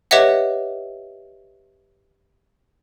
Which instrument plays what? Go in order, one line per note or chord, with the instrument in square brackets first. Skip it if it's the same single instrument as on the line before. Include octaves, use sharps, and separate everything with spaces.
[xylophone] G4 B4 C#5 D#5 E5 F#5